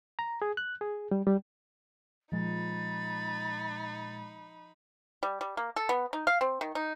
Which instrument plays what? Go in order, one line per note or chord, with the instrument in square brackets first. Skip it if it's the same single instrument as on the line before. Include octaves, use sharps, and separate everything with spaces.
[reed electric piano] A#5
G#4
F#6
G#4
G3
G3
[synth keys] A#2 G#3 [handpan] F3 [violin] D#4 B5 [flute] A6
[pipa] G3
G3
A#3
A4
B3
D#4
F5
C4
D#3
D#4